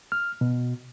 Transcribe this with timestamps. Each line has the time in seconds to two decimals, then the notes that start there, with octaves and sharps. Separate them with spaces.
0.12 F6
0.41 B2